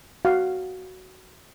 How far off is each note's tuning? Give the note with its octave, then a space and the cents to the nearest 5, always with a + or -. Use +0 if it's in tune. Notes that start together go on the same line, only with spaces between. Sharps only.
F#4 +5 F5 +0